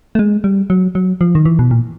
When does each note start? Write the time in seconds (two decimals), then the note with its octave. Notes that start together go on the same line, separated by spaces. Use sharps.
0.15 A3
0.19 G#3
0.44 G3
0.70 F#3
0.95 F#3
1.21 F3
1.35 D#3
1.45 E3
1.59 B2
1.71 A#2